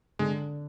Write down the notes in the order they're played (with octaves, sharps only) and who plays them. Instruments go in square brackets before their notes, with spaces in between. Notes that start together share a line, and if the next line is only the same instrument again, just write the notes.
[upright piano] D3 [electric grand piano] G#3